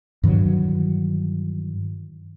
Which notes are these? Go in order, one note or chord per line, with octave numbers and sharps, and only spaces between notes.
G2 D#3 E3 F#3